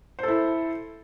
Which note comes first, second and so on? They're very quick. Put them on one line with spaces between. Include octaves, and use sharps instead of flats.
C5 A4 E4